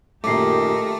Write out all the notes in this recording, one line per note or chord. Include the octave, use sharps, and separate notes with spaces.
F#2 A#2 D#3 A3 G4 A#4 D6 C7